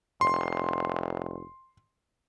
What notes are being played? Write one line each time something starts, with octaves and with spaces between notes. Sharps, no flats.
F1 C6